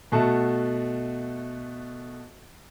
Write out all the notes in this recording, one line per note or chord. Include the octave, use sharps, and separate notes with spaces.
B2 A3 F#4 A5